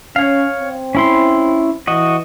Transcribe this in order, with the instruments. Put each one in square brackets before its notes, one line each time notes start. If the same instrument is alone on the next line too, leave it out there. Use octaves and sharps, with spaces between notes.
[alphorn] C#4 [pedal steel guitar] C#5 F5
[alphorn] C4
[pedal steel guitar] C#4 E4 C6
[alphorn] E3 [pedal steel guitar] F#4 D#5